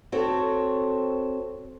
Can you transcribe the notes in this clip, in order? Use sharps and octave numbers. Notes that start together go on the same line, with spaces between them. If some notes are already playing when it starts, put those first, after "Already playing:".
C4 F#4 A4 C#5